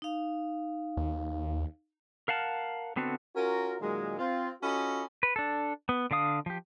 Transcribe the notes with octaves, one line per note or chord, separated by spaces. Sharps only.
D#4 F5
D#2
A#4 F5 F#5 A5
D3 B3 C4 F#4 A4
C#4 F4 F#4 A#4
A#2 D#3 F#3 G#3
C4 F4
C#4 F4 F#4 A4 D#5 B5
B4
D4 A4
B3
D3 D4 F5 D#6
F3 G4